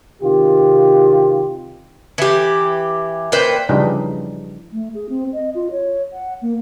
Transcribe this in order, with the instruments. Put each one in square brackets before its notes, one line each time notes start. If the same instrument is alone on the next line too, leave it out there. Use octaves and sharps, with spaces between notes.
[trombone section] C3 D#3 F4 G4
[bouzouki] E3 G4
A#2 B4 C5 G5
[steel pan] C#3 E3 F3 G3 D4 D#4
[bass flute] A3
G#4
C4
D#5
F4
C#5
F#5
A#3